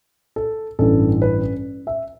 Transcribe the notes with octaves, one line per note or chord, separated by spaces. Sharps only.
A4
A1 G2 E3 A4
B4
E5